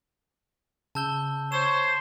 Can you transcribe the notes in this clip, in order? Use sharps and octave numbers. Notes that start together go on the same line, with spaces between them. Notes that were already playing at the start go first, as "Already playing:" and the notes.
C#3 A5 E6 G6 G7
C5 C#5 E7